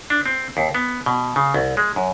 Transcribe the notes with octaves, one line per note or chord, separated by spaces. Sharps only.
D4
C4
D#2
B3
B2
C#3
C2
G#3
F#2